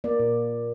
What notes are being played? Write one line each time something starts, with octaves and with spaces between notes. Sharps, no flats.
A#3 D5
A#2